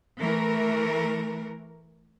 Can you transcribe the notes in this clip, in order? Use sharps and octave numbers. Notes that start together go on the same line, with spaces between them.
E3 A3 A#4